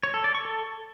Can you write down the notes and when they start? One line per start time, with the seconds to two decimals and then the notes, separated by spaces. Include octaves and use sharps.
0.03 C#5
0.14 A4
0.24 D5
0.35 C#6
0.45 A4